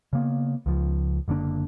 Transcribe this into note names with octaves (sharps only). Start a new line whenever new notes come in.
C#3 A#3 B3
C#2 F3
F#1 D3 A#3 D4